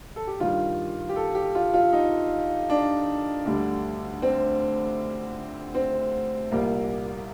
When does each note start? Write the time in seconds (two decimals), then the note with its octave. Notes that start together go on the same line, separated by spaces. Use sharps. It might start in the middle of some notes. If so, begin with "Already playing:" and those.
0.16 A4
0.27 G4
0.40 G2 D#3 G3 F4
1.09 G4
1.16 A4
1.35 G4
1.55 F4
1.74 F4
1.93 D#4
2.70 D4
3.46 D2 D3 G3
4.22 C4
5.75 C4
6.51 C2 A#2 G3 A#3